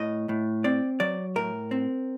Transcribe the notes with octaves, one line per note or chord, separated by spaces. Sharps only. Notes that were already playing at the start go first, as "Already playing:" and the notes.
Already playing: A2 D#5
A2
C4 D5
F#3 D5
A2 A#4
C4